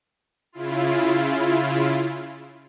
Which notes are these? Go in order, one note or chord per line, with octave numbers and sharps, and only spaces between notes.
C#3 E4 F4